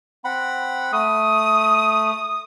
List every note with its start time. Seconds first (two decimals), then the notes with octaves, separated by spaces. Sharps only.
0.24 C4 F#5 B5
0.92 A3 D#6